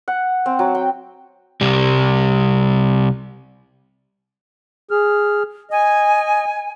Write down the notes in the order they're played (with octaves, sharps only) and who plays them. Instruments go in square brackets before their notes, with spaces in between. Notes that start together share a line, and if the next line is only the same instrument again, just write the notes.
[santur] F#5
C4
F#3
G5
[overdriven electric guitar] C2 G3
[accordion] G#4 F6
[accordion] D#5 [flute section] G#5